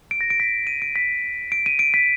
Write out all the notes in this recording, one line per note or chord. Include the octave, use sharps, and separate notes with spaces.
D7
A#6
D7
B6
D#7
D7
B6
D7
D#7
D7
B6